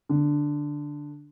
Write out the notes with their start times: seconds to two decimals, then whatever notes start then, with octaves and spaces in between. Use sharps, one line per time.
0.09 D3